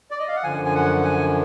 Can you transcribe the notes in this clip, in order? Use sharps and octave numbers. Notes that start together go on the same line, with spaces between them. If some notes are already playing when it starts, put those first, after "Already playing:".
D5
D#5
F5
F#5
F#2 D3 F3 G#5
G#5
F#5
F#5
G#5